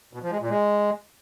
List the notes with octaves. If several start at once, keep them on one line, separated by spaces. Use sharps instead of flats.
B2
F3
G#3
A#2
G#3